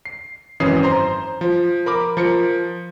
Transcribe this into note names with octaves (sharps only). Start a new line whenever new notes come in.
C7
G#1 F#2 E3 C#4 D#6 C7
C5 A#5 C6
F3
A#4 B5 D6
F3 A#4 C#7